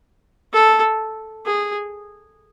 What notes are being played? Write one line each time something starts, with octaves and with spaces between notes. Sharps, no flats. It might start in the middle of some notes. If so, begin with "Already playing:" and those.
A4
G#4